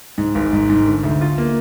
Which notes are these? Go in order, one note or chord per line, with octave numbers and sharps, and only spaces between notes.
G#2
G#1
G#2
G#2
D3
D2
F4
A#3